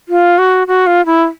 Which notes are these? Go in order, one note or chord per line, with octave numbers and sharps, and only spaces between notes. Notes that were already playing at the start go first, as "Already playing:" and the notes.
F4
F#4
F#4
F4
E4